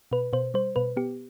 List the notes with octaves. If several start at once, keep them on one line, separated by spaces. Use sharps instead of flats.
B2 B4
B2 C5
G3 C5
B2 B4
B3 G4